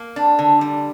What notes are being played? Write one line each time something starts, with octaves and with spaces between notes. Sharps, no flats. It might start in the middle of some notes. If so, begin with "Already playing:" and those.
Already playing: A#3
D4
D3
G3